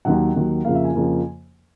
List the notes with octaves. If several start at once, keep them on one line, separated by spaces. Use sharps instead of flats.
D#2 D#3 F#3 F#5
D#2 D#3 F#3
F2 C#3 F3 A#3 F5
E5
G#5
F2 C#3 F3 A#3